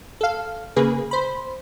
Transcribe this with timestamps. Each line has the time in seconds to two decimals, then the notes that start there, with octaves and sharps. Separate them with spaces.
0.21 A4 F5
0.76 C#3 A#3 G#4 B4
1.11 C5 B5